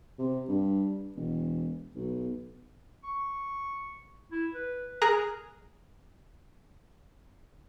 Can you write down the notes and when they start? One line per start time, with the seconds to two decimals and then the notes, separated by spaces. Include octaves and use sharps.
0.19 C3
0.48 G2
1.16 E1
1.95 B1
3.04 C#6
4.31 E4
4.54 B4
5.02 G#4 A#4 A#5 D#6 F#6